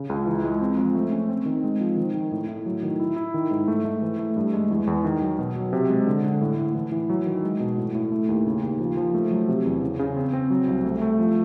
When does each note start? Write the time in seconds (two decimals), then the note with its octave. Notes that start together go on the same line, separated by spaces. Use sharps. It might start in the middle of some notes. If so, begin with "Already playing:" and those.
Already playing: C#3
0.09 C#2
0.27 E3
0.44 G#3
0.61 C4
0.78 F3
0.95 A3
1.12 C#4
1.29 C4
1.46 D#3
1.64 G#3
1.80 F3
1.97 D#3
2.14 D#3
2.32 A2
2.49 A2
2.66 F#3
2.83 D#3
3.00 E4
3.16 E4
3.34 D#3
3.51 G#2
3.68 A3
3.85 A3
4.02 E3
4.19 A3
4.36 G2
4.53 G#3
4.71 E2
4.87 E2
5.04 D#3
5.22 F#3
5.39 B2
5.56 F#3
5.73 C3
5.90 G#3
6.07 D3
6.24 D3
6.41 A2
6.58 A2
6.75 E3
6.92 E3
7.10 F#3
7.26 D#3
7.43 G#3
7.60 B2
7.78 A2
7.95 A2
8.12 A3
8.29 D#2
8.46 C#3
8.63 D#2
8.80 F3
8.97 F3
9.14 A3
9.31 F#3
9.49 C3
9.66 E2
9.82 C#3
9.99 C#3
10.16 C4
10.33 C4
10.50 F#3
10.67 C2
10.85 A3
11.02 A3
11.19 F3